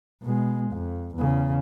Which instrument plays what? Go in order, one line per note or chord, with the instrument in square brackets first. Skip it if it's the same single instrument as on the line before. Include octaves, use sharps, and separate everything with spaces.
[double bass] B2 G#3
F2
E2 C#3